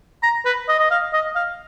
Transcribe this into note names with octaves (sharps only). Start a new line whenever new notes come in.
A#5
B4
D#5
D#5
F5
D#5
F5